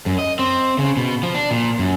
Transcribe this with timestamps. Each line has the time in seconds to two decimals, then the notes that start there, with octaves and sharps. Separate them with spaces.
0.06 F#2
0.19 D#5
0.39 C4
0.79 C#3
0.97 B2
1.23 F3
1.34 D4
1.51 A#2
1.79 F#2